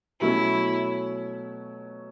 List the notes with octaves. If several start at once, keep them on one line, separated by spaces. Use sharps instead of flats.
B2 F#3 A3 C#4 E4